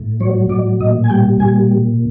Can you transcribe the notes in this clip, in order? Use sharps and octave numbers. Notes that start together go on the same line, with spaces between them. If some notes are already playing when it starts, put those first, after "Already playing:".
Already playing: A2
F#3 C#5
A2 D5
A#2 D#5
G#5
G3 G5
A#2 G#5